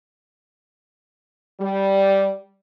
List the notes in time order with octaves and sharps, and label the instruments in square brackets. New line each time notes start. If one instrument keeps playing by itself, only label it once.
[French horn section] G3